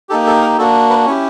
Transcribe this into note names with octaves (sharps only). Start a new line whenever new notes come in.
A#3 D#4 G4 A4
A4
A#4
A#3 D4 F#4 A4
B4
C#4 E4 G4 C#5